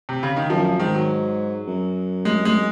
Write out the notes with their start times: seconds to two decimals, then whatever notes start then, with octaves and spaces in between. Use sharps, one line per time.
0.09 C3
0.23 C#3
0.36 D#3
0.50 F#2 F3
0.65 F3
0.79 G#2 D#3
0.95 F#3
1.67 F#2
2.25 G#3
2.45 G#3